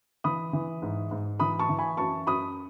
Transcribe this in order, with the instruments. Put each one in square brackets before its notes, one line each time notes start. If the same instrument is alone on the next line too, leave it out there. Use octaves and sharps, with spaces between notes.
[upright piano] E3 B5 D#6
E3
G#2
G#2
E3 B5 D#6
A5 C#6
E3
G#5 B5
F#2 A5 C#6
F#2 B5 D#6